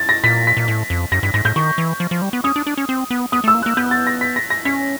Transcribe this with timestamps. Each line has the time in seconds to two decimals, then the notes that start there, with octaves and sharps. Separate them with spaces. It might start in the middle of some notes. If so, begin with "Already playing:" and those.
Already playing: A6
0.09 A#6
0.24 A#2 B6
0.47 B6
0.57 A#2
0.68 A2
0.90 F2
1.12 F#2 A#6
1.23 G2 B6
1.34 G#2 A#6
1.45 A2 G6
1.56 D#3 C#6
1.78 E3
2.00 F3
2.11 F3
2.22 G3
2.33 B3
2.44 C#4 D#6
2.56 D4
2.67 D4
2.77 C#4
2.89 C4
3.11 B3
3.32 B3 D#6
3.44 A3
3.48 E6
3.55 A#3
3.62 F#6
3.66 A#3
3.77 B3 G6
3.91 A6
4.07 A#6
4.21 B6
4.36 A#6
4.50 A#6
4.65 C#4 B6